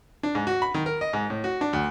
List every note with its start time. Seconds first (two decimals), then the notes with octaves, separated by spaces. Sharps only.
0.23 D4
0.35 G#2
0.47 F#4
0.62 B5
0.74 D#3
0.86 A#4
1.01 D#5
1.13 G#2
1.30 A2
1.44 F#4
1.61 D4
1.73 D2